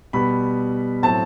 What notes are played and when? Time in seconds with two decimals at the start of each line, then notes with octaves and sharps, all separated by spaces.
0.13 B2 G3 B3 B5
1.02 A2 F#3 C4 A5